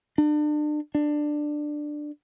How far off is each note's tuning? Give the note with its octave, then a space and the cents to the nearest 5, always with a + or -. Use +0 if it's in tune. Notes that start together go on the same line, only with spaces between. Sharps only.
D4 +35
D4 +15